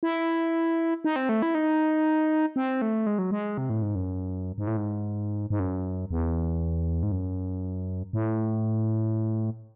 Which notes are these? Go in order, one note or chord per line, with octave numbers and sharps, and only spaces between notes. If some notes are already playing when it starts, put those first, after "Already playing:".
E4
D#4
C4
A3
E4
D#4
C4
A3
G#3
F#3
G#3
C3
A2
G#2
F#2
G#2
A2
G#2
G#2
F#2
E2
G#2
F#2
A2